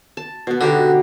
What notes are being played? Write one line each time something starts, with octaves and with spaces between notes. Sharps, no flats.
A5
B2 B3
D3 D#4 F#4 G4